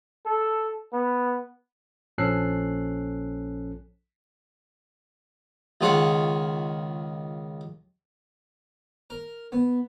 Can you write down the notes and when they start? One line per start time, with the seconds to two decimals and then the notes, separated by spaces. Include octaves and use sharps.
0.25 A4
0.93 B3
2.18 A#1 F3 C#4 A4 F#6 C7
5.81 C#2 D#3 F4 G#4 F#5 C#6
9.10 A#4
9.52 B3